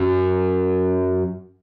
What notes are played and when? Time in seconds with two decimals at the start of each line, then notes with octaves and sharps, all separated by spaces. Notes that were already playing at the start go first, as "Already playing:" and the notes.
Already playing: F#2